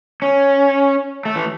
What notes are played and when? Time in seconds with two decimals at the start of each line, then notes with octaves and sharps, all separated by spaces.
0.22 C#4
1.25 A3
1.36 E3